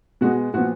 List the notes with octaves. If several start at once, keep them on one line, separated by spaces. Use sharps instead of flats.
B2 G#3 B3 F#4
A#2 F3 B3 F#4